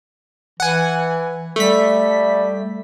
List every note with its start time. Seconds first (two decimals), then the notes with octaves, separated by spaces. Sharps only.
0.60 E3 F#5 G#5
1.56 G3 A3 B6